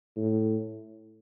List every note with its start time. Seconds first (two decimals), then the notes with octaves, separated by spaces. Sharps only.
0.17 A2